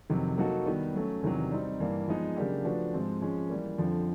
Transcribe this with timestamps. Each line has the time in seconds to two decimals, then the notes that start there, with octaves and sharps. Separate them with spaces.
0.10 F2 C3 D#3 F#3
0.38 F#3 A#3 D#4 F#4 A4
0.66 D#3 G3 B3
0.94 F#3 A3 C#4
1.22 E2 C3 D#3 F#3
1.51 G3 C4 D#4
1.80 G2 E3 G3 A#3
2.08 F3 G#3 B3 D#4 G#4
2.37 C#3 F#3 A#3 D4 G4
2.65 F3 A3 D4 F#4 B4
2.94 G#2 F3 G#3 C4
3.22 F3 G#3 C#4
3.50 E3 G3 A#3
3.78 F2 D3 F3